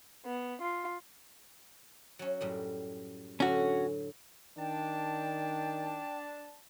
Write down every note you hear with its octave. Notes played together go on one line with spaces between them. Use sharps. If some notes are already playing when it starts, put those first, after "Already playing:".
B3
F4
F#3 C#4
F#2 A2 G3
A2 D3 F#3 C#4 F#4
D#3 D4 G5 A5